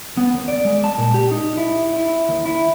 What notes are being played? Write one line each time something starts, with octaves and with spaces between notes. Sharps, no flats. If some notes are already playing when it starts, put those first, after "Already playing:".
B3
D#2
D5
G#3
A5
A#2
G4
D#4
E4
E4
D#2
E4